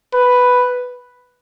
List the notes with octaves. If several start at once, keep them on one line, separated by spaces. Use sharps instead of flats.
B4